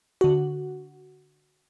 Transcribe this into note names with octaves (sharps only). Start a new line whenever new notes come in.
D3 F#4